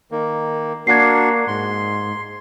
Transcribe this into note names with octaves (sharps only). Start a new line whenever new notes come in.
D#3 A#3
A#3 D4 F#4 G#6 C7
G#2 C6